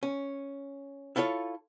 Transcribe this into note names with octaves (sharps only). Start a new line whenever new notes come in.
C#4
E4 F4 A4 C#5 F5